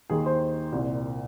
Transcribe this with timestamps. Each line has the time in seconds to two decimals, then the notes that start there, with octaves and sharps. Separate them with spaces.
0.10 D#2 D#3 G#4
0.26 C5
0.72 C2 A#2